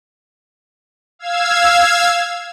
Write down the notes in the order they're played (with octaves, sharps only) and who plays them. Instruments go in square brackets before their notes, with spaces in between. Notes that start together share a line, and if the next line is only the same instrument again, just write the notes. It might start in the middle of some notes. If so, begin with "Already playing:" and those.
[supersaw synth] F5 E6 G#6